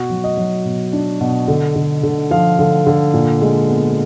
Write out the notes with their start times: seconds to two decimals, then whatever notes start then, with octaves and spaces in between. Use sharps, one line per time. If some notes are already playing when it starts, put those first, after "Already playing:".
Already playing: B2 F#4
0.10 F#3
0.24 D#5
0.37 F#3
0.65 B2
0.93 D4
1.20 B2
1.48 D3
1.76 D3
2.03 D3
2.31 F3 F5
2.59 D3
2.86 D3
3.14 A#2
3.42 G#3
3.69 B3